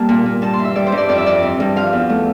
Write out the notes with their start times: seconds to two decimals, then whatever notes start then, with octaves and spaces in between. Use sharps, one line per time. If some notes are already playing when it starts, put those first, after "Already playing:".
Already playing: G3 A#3 A5
0.09 A#2
0.26 A#2
0.42 G2 A5
0.54 C6
0.59 E3
0.65 E5
0.75 G3 D5
0.87 C5
0.92 G2
0.97 D5
1.09 F2 D5
1.18 E5
1.26 F2 D5
1.43 E3
1.60 G2
1.76 F3 F5
1.93 E2
2.10 A3